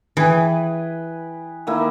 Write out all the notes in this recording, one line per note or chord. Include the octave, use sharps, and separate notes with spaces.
E3 G#4 B4 G5
D#3 A#3 E4